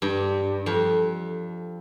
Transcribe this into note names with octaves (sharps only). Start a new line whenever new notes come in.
G2
F2